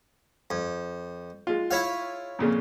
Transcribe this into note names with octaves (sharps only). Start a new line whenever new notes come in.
F2
G#3 F4
E4 C#5 F5
F2 A#2 C#3